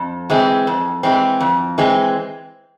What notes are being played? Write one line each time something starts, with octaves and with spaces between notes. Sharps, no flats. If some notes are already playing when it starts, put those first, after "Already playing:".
Already playing: F2
E3 G#3 C4
F2
E3 G#3 C4
F2
E3 G#3 C4